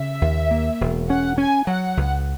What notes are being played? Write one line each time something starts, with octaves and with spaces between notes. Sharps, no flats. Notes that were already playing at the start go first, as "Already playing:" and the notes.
Already playing: C#3 E5
D#2
A#3
E1
C#4 F#5
C#4 G#5
F#3 F#5
C#2